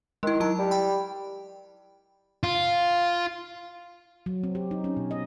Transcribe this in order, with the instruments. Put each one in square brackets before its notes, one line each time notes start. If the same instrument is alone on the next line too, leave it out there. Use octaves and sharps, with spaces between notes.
[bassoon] D#3 [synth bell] G#3 E4
[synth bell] F#3 E4 A5
[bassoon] G3
[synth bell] G5 B5
[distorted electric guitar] F4
[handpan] F#3
C4
G4
D#4
C#4
B2
D#5